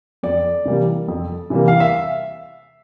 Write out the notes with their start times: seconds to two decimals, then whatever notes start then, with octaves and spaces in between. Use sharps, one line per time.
0.23 F2 D5
0.65 C3 E3 G3 A#3
1.08 F2
1.50 C3 E3 G3 A#3
1.68 F5
1.80 E5